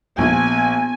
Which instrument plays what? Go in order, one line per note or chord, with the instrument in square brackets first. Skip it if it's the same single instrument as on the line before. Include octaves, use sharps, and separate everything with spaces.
[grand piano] A#1 [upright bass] B3 [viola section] G#5